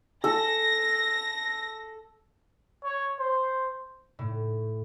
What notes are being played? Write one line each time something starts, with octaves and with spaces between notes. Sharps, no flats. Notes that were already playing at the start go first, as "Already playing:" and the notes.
A4 A#6
C#5
C5
A2